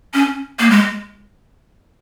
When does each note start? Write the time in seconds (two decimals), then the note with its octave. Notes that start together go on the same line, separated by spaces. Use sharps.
0.14 C#4
0.60 A#3
0.70 G#3